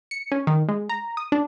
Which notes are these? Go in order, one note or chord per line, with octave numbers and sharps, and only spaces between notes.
C#7
C#4
D#3
G#3
A#5
D#6
D4